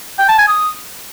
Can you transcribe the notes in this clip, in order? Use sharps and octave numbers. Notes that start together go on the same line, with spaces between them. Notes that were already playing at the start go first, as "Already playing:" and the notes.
G5
A5
G#5
D#6